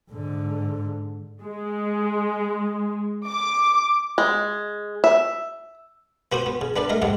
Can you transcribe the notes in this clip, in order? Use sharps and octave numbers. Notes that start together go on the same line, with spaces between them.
G#2 D3
G#3
D6
G#3
E5
B3 F#4 C5 D#6
B3
C#3
B3 D4 B4 D5
A3 A#4 D#5
D#2 G#2 D#3 F#5